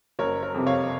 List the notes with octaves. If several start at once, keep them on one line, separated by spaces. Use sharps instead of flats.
F#1 A#4 C#5
A#4 C#5
F2 C3
C#5 F5